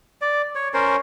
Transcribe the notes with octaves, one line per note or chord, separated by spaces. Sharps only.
D5
C#5
C#4 A#4 C5